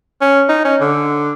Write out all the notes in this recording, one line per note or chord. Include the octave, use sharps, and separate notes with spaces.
C#4
D#4
C#4
D3